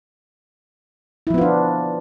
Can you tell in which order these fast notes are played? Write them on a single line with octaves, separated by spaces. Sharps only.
E4 F3 B3 F4 D4